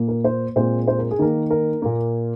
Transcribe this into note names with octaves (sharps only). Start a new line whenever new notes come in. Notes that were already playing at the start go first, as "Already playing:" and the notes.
Already playing: A#2 A#3
A#4
C5
A#2 G#3 C4 C5
C5
A#4
G#4
D#3 A#3 A#4
A#4
A#2 A#3